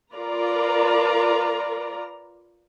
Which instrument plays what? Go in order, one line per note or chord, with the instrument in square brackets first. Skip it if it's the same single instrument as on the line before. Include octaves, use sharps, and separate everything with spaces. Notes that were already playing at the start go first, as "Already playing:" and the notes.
[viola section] F4 A#4 B4 D5 A#5